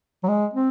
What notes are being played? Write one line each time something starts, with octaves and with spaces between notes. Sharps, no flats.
F#3
G#3
C4